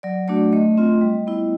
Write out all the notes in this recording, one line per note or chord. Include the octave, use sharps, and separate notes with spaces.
F#3 D5
A3 D4 F#4 D5
A3 D#5
C4 F4
G3
B3 E4